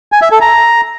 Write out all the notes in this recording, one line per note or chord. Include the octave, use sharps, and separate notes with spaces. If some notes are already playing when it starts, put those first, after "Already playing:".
G#5
E5
A4
A#5